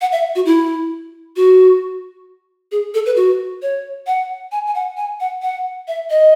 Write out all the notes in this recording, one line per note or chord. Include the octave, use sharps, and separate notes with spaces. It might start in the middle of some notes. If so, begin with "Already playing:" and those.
F#5
E5
F#4
E4
F#4
G#4
A4
B4
F#4
C#5
F#5
G#5
G#5
F#5
G#5
F#5
F#5
E5
D#5